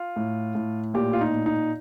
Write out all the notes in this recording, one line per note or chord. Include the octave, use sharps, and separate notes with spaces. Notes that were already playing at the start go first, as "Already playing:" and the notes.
Already playing: F4
A2
A2
A#2 G4
F4
D#4
A#2
D#4